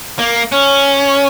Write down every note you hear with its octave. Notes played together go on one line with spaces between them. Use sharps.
A#3
C#4